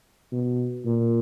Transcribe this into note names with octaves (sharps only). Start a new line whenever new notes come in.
B2
A#2